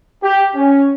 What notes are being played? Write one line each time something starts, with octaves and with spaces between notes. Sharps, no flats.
G4
C#4